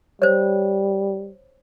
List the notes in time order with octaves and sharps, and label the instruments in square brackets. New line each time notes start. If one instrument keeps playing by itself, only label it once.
[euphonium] G3 [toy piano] C5 C#5